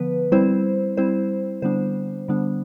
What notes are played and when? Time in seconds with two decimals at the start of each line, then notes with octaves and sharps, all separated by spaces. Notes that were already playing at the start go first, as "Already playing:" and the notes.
Already playing: D3 F3 B3 B4
0.32 G3 C4 E4 C5
0.97 G3 C4 E4 C5
1.62 D3 G3 B3 D4 C5
2.28 D3 G3 B3 D4